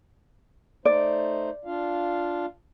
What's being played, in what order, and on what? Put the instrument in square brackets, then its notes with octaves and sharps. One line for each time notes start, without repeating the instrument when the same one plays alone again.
[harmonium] A3 D#4 C5 [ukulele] D5
[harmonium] D4 F4 F5